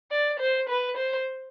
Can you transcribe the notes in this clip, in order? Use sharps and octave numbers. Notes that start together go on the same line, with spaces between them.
D5
C5
B4
C5